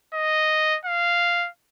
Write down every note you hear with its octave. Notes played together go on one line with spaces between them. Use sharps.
D#5
F5